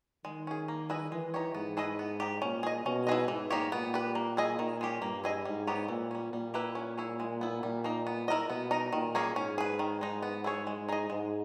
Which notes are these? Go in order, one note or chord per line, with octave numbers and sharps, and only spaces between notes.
D#3 G#3
C#4 G#4
A#3
E4 G#4 B4 D#5
E3 G#3
D#4 G4 C#5
G#2 B3
E4 G#4 B4 D#5
B3
D#4 G4
A#2 C#4
G#4 D#5
B2 C#4
E4 G#4 B4 D#5
G#2 E3
A#3 D#4 G4 C#5
A#2 B3
G4 B4
A#3
E4 G#4 D#5
A#2 D#3
G#3 C#4 G4
G2 A#3
E4 G#4 D#5
G#2 G3
B3 D#4 G4 C#5
A#2 E3
G3 C#4
A#2 G3
A#3 E4 G4 B4
C#4
E4 G#4 C#5
G#3
B3 E4
A#2 G3
A#3 D#4
B3
E4 A#4 D#5
B2 B3
D#4 A#4 D#5
A#2 D#3
A#3 C#4 G#4
G#2 C#4
G#4 B4
D#3
G#3 D#4
B3
E4 G#4 C#5
G#3
D#4 G#4 D#5
G#2 G#3